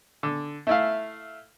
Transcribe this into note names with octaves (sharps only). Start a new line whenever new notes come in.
D3
A3 E4 F5